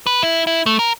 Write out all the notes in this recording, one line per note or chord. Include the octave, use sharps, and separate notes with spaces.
B4
E4
E4
A3
A#4